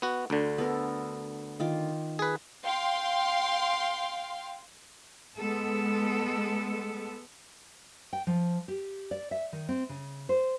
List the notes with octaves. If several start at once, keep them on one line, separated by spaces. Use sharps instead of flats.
B3 F#4
D2 D3
B3 A4 A#4
D#3 F4 D6
G#4 B4
F5 G5 C6
G#3 B3 A4
G5
F3
G4
D5
E5
D#3
C4
C#3
C5